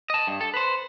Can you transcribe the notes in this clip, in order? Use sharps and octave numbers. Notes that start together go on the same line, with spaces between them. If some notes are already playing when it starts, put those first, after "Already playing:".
D#5 A5
G2
A4
B4 C5